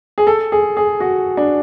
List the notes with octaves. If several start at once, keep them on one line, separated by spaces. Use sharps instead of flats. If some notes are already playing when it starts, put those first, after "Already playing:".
G#4
A4
G#4
G#4
F#4
D4